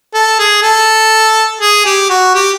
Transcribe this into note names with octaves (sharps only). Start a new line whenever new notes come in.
A4
G#4
A4
G#4
G4
F#4
G4